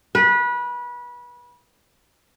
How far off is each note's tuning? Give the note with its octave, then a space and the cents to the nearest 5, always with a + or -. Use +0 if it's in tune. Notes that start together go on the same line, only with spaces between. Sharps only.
B4 -25